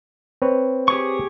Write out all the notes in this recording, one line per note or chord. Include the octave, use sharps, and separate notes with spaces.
C4 B4 C#5
G4 G#4 C#6